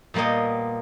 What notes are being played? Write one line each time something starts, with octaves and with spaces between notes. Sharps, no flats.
A#2 G3 A#3 B3 D#5